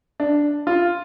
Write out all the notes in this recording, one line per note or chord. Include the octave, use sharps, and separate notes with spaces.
D4
F4